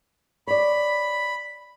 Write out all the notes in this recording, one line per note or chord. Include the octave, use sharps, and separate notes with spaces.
C#5 D5 B5